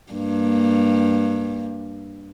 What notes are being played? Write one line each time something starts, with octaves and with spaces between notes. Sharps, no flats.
G2 A#3